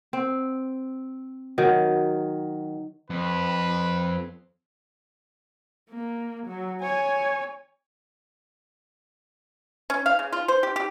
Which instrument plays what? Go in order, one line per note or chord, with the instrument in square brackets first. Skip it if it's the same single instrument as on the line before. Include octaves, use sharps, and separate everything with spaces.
[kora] C4
D#3 F#3
[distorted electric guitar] F2 [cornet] B4
[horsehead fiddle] A#3
F#3
C#5 G#5
[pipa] C#4
F5
C#3
F4
C5
G4
G4